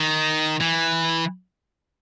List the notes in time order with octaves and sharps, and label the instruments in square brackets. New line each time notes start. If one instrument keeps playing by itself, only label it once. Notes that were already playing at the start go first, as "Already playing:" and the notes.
Already playing: [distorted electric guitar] D#3
E3